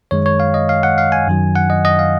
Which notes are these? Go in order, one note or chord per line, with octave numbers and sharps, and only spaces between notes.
F#2 D#3 G#3 C#5
C#5
F5
D#5
F5
F#5
F5
G#5
F#2 D#3 F#3
F#5
D#5
D#5
F5